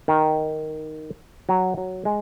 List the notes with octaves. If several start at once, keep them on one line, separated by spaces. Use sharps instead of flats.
D#3
F#3
F#3
G#3